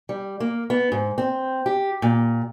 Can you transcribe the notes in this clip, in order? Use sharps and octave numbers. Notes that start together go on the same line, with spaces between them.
G3
A#3
B3
G#2
C4
G4
A#2